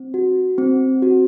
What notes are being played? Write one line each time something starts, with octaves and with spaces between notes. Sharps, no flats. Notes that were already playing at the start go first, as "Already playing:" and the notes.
Already playing: C4
F#4
C4
F#4